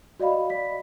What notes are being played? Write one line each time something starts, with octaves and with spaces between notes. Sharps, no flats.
F#4 D5 D#5 F5 B5
D5 B6